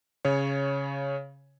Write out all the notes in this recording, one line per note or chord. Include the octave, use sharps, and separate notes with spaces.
C#3 C#5